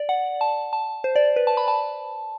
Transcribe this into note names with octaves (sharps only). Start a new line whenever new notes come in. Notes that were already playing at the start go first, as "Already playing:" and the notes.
Already playing: D5
F#5
A5
A5
C5
D5
B4
A5
B5
A5